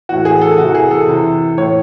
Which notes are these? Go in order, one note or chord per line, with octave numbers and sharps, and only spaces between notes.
A2 E3 F#4
G#4
A4
C3 E3 F#4
G#4
A4
C3 E3
A2 E3 C#5